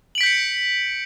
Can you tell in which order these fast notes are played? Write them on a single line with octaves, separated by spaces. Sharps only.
F#7 D7 B6 G6 C#7